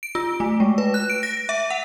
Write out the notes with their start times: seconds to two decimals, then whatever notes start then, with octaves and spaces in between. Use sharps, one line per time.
0.03 D7
0.15 F4
0.40 A3
0.60 G#3
0.78 B4
0.94 F#6
1.10 D7
1.23 A#6
1.49 E5
1.70 F#5